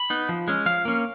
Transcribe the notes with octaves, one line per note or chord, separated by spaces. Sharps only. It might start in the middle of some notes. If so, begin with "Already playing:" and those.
Already playing: B5
B3 D#4
F3
G#3 C#4
F3 F5
A#3 C#4